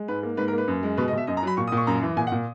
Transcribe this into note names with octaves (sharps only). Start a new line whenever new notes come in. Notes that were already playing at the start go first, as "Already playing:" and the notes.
Already playing: G#3
G#2 B4
A#3
G#2 B4
A#4
A#3
B4
F#2
G#3
B2 B4
D#5
B2 E5
F#2 D#5
A#5
F#3 B5
A#2 C#6
D#6
A#2 C#6
F#2 A#5
E3
A#2 G#5
F#5
A#2